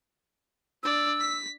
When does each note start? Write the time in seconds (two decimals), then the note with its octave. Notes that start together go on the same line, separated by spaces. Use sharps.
0.83 D4 D5 E6
1.20 B6